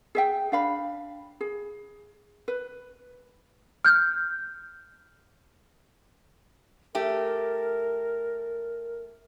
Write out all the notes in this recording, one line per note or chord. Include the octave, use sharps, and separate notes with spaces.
G#4 E5 G5
D4 F5 B5
G#4
B4
F6 G6
A3 G4 A#4